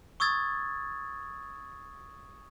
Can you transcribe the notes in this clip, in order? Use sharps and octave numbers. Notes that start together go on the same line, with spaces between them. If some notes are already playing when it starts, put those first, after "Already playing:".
C#6 D#6 E6 G#6 A6